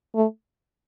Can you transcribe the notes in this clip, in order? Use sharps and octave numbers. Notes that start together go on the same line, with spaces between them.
A3